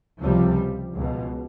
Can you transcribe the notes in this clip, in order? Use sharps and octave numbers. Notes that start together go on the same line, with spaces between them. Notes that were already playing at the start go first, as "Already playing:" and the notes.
C#2 C3 F3 G3
C#2 B2